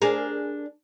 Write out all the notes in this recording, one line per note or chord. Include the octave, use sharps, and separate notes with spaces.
D4 G#4 A#4